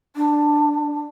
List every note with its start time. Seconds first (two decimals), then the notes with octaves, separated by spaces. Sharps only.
0.16 D4